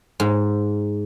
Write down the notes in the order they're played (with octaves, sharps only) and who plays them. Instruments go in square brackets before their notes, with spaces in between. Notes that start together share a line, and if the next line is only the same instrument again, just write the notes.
[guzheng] G#2